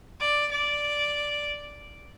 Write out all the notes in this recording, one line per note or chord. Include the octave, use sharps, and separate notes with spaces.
D5
D5